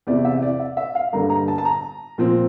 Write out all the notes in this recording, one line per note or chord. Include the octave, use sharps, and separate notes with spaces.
E2 C3 E3 D5
E5
D5
E5
E5
F5
G2 D3 G3 A#3 A#5
A#5
A5
A5
A#5
A#2 F3 C4